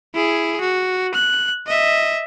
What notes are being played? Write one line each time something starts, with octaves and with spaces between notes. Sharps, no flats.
E4 G#4
F#4
F#6
D#5 E5